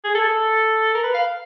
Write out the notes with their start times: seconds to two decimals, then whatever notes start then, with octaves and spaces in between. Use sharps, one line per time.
0.05 G#4
0.15 A4
0.25 A4
0.95 A#4
1.04 B4
1.14 F5